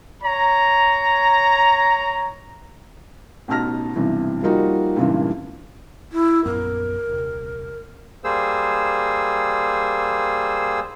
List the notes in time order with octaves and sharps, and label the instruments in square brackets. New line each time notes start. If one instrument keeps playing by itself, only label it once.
[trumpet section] C#5 A#5
[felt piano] A1 B2 D#4 A5 F6 A#6
B1 G2 C3 E3
F3 G3 A#3 D#4 F4 F#4
G#1 G2 A#2 C#3 E3
[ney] E4
[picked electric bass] A#1 F#2 B3 [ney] A#4
[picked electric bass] D#1 C2
[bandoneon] G3 A#3 G#4 C5 E6